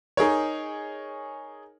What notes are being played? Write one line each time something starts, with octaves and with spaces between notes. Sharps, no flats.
D#4 G#4 A#4 C#5